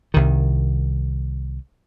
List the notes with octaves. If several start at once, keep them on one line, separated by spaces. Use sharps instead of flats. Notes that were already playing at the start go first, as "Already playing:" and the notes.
C2 D#3